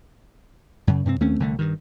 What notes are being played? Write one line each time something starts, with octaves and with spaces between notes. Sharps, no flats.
F#2 C#3
G2 C3 A3 C4
D#2 A3 C4 C#4
C2 D3 F#3 A3
G2 D#3